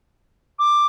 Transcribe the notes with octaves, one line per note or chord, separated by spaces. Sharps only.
D6